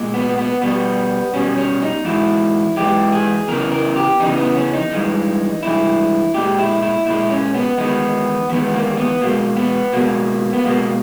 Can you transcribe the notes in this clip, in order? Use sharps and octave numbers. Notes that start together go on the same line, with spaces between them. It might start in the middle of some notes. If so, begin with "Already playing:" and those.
Already playing: A#2 G#3
B3
B3
B2 G3 B3
B2 G3 C#4
C#4
D#4
G#2 E3 G#3 E4
G#2 E3 G#3 G4
G#4
E2 C#3 E3 A#4
A#4
G4
E2 C#3 E3 D#4
B3
C#4
D#4
G2 E3 G#3
G2 E3 G#3 E4
A#2 G#3 G4
E4
E4
A#2 G#3 E4
C#4
B3
E2 D#3 G#3 B3
E2 D#3 G#3 B3
A#3
B3
B2 G#3 A#3
B3
B2 G#3 A#3
B3
B2 G#3 A#3